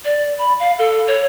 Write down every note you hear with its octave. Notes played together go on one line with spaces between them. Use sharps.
D5
B5
F5
A4
C#5